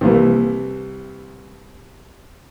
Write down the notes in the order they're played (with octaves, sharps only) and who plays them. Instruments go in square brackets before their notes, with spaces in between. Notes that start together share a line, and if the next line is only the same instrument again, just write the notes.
[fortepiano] C2 E3 [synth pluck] A#3 C4